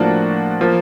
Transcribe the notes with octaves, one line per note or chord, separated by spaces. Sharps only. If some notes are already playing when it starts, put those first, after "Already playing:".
Already playing: A2 F3 A#3 D4 F#4
F3 A#3